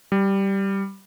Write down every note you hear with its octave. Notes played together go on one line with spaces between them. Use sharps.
G3